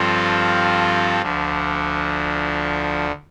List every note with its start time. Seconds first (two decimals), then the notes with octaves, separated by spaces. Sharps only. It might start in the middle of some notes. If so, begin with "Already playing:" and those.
Already playing: G2 F3 C4 F4 A4
1.22 D2 D3 F3